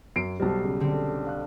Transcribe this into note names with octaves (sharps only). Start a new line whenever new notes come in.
F#2 C7 D7
B1 G3 C5 A5
C#3
D3 C4
F5 F#6